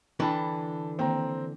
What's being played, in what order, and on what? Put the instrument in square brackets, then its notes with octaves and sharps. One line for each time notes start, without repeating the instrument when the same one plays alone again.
[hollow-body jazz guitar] D3 E3 D4 [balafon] E4 [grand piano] G5 A5 B5
[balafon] D#3 A#3 G5 [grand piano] C4 A#5